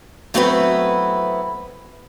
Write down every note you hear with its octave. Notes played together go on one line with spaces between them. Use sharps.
F#3 A3 B3 C4 E4 B4